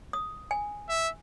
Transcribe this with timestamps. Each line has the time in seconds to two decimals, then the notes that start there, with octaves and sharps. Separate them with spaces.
0.13 D#6
0.51 G#5
0.89 E5